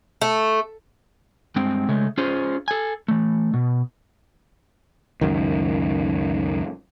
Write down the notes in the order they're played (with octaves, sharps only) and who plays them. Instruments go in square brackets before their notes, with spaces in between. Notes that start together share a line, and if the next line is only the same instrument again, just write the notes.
[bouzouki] A3
[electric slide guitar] G2 G#3 C4 G5
C#3 G#3 A3
C#4 F4 G#4 C5
A4 G#5
E3 A3
B2
[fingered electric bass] C#2 F#2 D#3